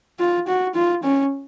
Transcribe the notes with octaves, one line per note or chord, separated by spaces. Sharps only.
F4
F#4
F4
C#4